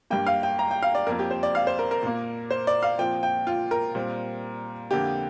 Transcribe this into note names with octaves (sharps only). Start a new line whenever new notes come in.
G2 G3 A#3 G5
F5
G5
A#5
G5
F5
D5
F2 F3 A#3 A#4
G4
C5
D5
F5
C5
A#4
A#4
A#2 A#3
C5
D5
F5
A#2 F3 C4 G5
G5
F4
A#4
A#2 G3 C4
F2 D3 A#3 G4